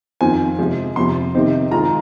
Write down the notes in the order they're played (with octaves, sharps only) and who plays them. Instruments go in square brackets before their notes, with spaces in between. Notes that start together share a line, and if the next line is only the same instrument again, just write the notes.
[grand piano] F2 D#3 C4 F4 G#5
C3 F3 G#3
F2 C3 F3 C6
C3 D#3 C4 D#4
D#3 G#3 F4 A#5